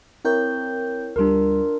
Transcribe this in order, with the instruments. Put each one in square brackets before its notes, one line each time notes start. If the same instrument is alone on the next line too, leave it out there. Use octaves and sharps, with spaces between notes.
[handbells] C4 G6 [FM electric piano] E4 A#4 C#5
[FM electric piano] D2 G3 [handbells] D4 F4 A#4